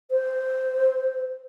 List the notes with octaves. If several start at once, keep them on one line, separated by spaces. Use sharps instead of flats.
C5